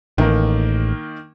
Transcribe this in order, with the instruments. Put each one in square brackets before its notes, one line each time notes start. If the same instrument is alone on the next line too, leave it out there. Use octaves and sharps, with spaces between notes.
[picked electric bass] A1 [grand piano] D#3 A#3